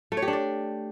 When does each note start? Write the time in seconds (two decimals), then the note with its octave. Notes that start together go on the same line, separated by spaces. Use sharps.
0.12 A3
0.17 C#5
0.22 G4
0.28 D4
0.33 D5